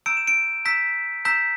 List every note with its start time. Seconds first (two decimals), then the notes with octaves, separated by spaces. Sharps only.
0.06 A#5 E6 G6 D7
0.17 E7
0.27 D7
0.65 A#5 E6 G6 B6
1.25 A#5 E6 G6 B6